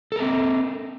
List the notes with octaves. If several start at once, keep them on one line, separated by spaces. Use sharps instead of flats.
C4 A4 A#4